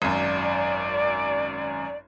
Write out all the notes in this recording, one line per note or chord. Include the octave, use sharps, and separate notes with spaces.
G#1 F#2 D5